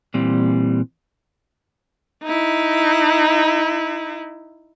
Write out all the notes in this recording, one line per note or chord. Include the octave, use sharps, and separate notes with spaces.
A#2 E3 G3 C4
D#4 E4